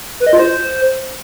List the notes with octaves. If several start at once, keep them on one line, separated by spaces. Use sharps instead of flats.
B4
D#5
F4
C5